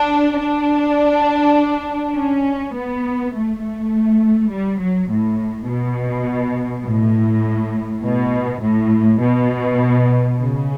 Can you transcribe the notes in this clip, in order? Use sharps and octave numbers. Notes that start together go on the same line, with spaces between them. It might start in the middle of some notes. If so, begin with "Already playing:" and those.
Already playing: D4
D4
C#4
B3
A3
A3
G3
F#3
A2
B2
A2
B2
A2
B2
C#3